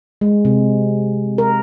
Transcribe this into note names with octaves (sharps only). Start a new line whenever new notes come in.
G#3
C3
A#4